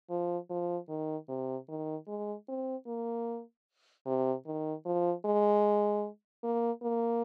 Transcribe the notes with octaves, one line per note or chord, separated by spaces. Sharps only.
F3
F3
D#3
C3
D#3
G#3
C4
A#3
C3
D#3
F3
G#3
A#3
A#3